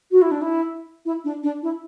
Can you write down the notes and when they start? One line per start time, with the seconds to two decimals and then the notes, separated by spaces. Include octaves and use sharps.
0.11 F#4
0.22 E4
0.31 D4
0.42 E4
1.06 E4
1.24 D4
1.43 D4
1.63 E4